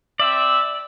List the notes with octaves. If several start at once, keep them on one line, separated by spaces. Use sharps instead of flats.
C4 D5 E5